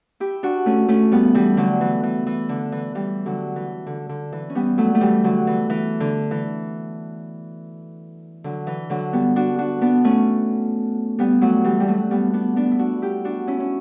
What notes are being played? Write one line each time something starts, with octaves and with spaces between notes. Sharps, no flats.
E4 G4
D4 F#4
A3 C#4
A3 C#4
G3 B3
E3 G3
D3 F#3
E3
E3
E3
D3
E3
E3 G3
D3 F#3
E3
D3
D3
E3
C#4
G3 B3
F#3 A3
A3
E3 G3
D3 F#3
E3
E3
D3
E3
D3 F#3
E3
D3 F#3
G3 B3
D4 F#4
D4 F#4
B3 D4
A3 C#4
G3 B3
F#3 A3
E3 G3
G3
F#3 A3
G3 B3
B3 D4
B3 D4
E4
D4 F#4
E4 G4
D4 F#4
C#4 E4
C#4